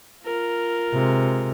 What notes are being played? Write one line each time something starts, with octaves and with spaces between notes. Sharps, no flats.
F4 A#4
C3 G#3